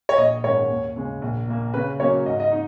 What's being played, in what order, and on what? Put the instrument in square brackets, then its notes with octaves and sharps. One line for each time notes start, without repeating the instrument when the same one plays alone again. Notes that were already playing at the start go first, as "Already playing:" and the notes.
[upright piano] C#5
[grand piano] A#1 [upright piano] D#5
[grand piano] G#2 D#3 G#3 C#4 [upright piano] C#5
[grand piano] D#2
C#3 G#3
A#1
A#2 A#3
[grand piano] C#3 [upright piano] B4
[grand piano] F#3 A#3 C#4 [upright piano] C#5
[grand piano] G#2 [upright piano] D#5
[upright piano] D#5
[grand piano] D#4